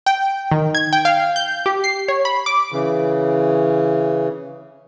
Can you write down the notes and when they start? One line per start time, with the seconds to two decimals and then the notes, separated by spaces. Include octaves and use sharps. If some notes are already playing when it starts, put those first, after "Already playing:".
0.06 G5
0.51 D#3
0.75 G#6
0.93 G5
1.05 F5
1.36 G6
1.66 G4
1.84 C7
2.08 C#5
2.25 B5
2.46 D6
2.72 C#3 E3